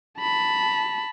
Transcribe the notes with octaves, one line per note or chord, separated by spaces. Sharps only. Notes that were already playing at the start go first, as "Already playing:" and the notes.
A5 B5